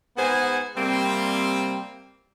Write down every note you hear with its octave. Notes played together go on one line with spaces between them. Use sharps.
G#2 B3 G#4 C5 F#5 G#5
C3 G3 A#3 C4